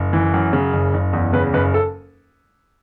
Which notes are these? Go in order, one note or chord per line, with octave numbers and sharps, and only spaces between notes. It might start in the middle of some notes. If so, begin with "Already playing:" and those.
Already playing: F#1
E3
F#2
C#3
F#1
F#1
E2
C#3 B4
F#1 B4
A4